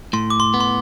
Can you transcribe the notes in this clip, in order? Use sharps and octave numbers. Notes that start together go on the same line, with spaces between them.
A2 C6
D6
C6
B3
C6